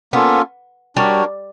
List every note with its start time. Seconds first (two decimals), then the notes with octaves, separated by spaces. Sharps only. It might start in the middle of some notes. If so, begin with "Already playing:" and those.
0.13 A#3 B3 C#4 F4 A4
0.96 G3 D4 F#4 A#4 C#5